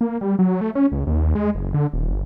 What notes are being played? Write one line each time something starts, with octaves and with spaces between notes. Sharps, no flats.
A#3
G3
F#3
A3
C#4
C#2
D#2
G#3
F#1
D3
D#1
G1